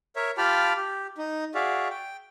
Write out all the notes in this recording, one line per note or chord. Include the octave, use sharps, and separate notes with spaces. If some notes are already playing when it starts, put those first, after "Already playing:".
A#4 C#5 E5
F4 G4 G5 A5 B5 F6
G4
D#4
F#4 G#4 D5 E5 F5
G5